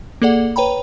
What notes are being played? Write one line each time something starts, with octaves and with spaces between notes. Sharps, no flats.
A#3 G#4 A4 D5 F#5
B4 C#5 G5 A#5 B5